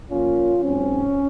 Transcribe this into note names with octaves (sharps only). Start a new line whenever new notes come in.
A#2 F3 A#3 C#4 F4
G#2 F#3 C4 C#4